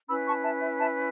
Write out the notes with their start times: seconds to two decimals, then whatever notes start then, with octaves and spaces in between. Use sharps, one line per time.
0.08 C#4 E4 B4 B5 E6
0.26 A5 C#6
0.43 E5 A5
0.60 E5
0.78 E5 A5